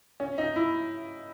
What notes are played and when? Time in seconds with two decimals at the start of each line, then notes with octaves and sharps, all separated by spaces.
0.20 C#4
0.38 D#4
0.56 E4